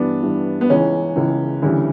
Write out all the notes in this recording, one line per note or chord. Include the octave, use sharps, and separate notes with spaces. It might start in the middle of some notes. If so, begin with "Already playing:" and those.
Already playing: G2 E3 G3 B3 D4
G2 E3 G3
B3
C#2 C#3 E3 C#4
C#2 C#3 E3
D2 C#3 E3 G3